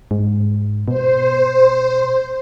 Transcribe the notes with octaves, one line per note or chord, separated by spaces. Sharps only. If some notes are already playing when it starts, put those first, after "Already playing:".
G#2
B2 C5